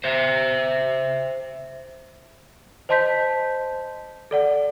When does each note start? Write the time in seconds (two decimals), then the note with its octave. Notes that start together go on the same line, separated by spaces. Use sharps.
0.04 C5 E5
2.89 C5 D#5 A5 C6 G6 B6
4.31 A4 D5 F#5